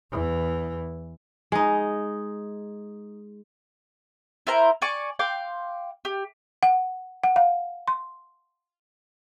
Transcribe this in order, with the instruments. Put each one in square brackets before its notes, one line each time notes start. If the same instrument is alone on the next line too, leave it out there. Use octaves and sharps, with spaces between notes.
[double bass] E2 E3
[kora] G#3 D#4
[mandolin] E4 A#4 C5 A#5
D5 G#5 C#6 D6
F5 G5 C6 D6
G4
[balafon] F#5
F#5
F5
C6